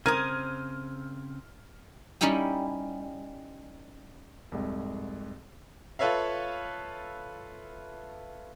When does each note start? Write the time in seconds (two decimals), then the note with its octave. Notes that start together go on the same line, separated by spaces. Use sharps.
0.06 C#3 C4 A#4 C5 D#6 F6 G#6 D#7
2.21 G3 C#4 D#4 E4 G4
4.52 C2 F2 G#2
5.99 F4 A4 B4 C#5 E5 F5